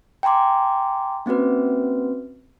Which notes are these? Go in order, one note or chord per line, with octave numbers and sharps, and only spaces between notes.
G5 G#5 A#5 C6 D6
A#3 C4 C#4 F#4 B4